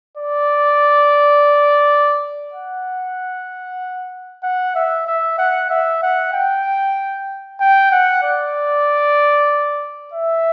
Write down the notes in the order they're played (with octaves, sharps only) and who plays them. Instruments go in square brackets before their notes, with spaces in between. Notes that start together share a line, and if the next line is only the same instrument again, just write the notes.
[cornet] D5
F#5
F#5
E5
E5
F#5
E5
F#5
G5
G5
F#5
D5
E5